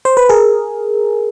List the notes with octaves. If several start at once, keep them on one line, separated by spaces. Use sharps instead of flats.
C5
B4
G#4 A#4